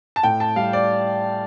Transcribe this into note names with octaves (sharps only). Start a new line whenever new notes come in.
A5
A2 G5
A5
G3 F5
D5